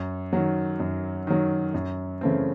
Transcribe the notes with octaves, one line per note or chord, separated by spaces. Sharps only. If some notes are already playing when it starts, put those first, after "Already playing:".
Already playing: F#2
D#3 F#3
F#2
D#3 F#3
F#2
C#3 E3 A3 C4